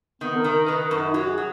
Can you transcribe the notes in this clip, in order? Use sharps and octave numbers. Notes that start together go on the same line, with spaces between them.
D#3 B3
A#4
D#3
A#4
D#3 B4
A#4
F#2
D#4
F#3 F#4
G#4
F#3